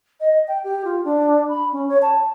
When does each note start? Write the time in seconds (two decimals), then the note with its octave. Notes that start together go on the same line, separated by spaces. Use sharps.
0.20 D#5
0.48 G5
0.64 G4
0.85 F4
1.05 D4
1.49 B5
1.72 C#4
1.89 C#5
2.02 A5